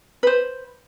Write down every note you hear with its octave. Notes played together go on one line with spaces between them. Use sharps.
B4 C5